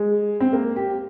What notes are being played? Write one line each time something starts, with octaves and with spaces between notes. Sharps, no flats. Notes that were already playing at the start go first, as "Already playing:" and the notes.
Already playing: G#3
C4
A#3
G4